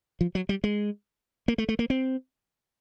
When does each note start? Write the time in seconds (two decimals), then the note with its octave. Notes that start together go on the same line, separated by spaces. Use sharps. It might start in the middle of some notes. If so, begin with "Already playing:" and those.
0.21 F3
0.35 F#3
0.49 G3
0.64 G#3
1.48 A#3
1.58 A3
1.69 A3
1.79 A#3
1.90 C4